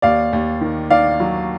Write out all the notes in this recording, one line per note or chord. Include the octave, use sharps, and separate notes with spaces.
D#2 D5 F5
D#2
D#3
D#3 D5 F5
F#3